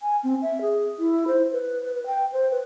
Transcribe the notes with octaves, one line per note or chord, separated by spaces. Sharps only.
G#5
C4
E5
G#4
E4
C5
B4
G5
C5
B4